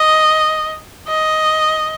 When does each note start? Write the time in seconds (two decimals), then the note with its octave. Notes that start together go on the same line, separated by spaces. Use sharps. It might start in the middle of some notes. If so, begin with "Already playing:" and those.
Already playing: D#5
1.08 D#5